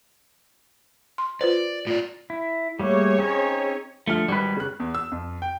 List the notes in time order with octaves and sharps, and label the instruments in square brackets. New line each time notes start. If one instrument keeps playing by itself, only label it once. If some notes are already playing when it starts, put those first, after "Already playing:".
[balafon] C6
[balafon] F4 B4 C5 [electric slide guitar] D5
[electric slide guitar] A2 D5 [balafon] F4
[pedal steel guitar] E4
[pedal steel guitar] G3 A3 A#3 [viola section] G#4 C#5
[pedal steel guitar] C4 C#4 D#4
[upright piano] D3 F3 F6 [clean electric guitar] A3
[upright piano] G#1 [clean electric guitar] G3 B4
[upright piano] C#3 F#6
[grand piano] E2
E6
F2
G5